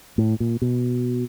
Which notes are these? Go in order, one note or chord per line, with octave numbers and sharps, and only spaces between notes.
A2
A#2
B2